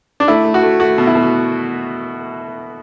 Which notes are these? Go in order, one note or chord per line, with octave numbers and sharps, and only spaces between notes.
D4
A3 E4
A3
F#4
A3
A3 F#4
B2
E4
B2